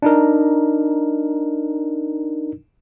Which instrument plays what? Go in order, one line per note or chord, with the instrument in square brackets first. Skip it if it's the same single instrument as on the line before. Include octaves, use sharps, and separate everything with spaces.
[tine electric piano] D4 D#4 A#4